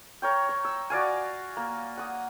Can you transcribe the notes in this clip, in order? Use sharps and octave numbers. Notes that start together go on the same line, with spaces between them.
A#4 C#5 G5
C#5
E6
F#4 D5 F5 G#5
A#3
F#5 D#6